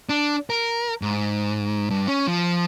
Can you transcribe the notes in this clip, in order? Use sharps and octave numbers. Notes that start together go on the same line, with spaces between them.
D4
A#4
G#2
G2
C#4
F3